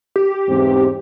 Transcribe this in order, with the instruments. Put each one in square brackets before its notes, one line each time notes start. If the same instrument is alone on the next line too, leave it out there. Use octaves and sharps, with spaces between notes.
[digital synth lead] G4
[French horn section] E2 G#2 C4